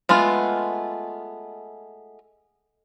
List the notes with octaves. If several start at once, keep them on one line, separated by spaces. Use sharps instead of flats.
G#3 A3 B3 F4